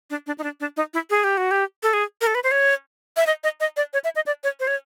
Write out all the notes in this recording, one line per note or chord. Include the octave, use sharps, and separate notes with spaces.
D4
D4
D#4
D4
D4
D#4
E4
G#4
G4
F#4
G4
A4
G#4
A#4
A4
B4
C5
C#5
E5
D#5
D#5
D#5
D5
C#5
E5
D#5
D5
C#5
C5
C#5